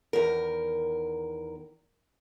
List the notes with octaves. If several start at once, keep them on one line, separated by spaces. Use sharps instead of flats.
E2 D#3 A#4